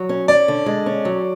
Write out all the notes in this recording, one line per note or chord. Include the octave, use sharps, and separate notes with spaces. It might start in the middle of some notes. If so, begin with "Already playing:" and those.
Already playing: F#3
C#4
C#4 D5
D3
G#3
C#4
F#3